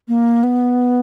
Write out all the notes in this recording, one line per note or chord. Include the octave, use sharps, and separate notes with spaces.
A#3
B3